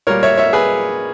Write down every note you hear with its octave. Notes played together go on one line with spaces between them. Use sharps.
A#2 G3 A#3 A#4 C#5
C#5 E5
C#5 E5
G#4 B4